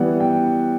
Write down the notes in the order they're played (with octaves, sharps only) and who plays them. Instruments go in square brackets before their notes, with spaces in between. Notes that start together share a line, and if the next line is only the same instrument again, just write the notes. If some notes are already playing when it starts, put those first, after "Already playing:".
Already playing: [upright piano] E3 G3 B3 F#5
G5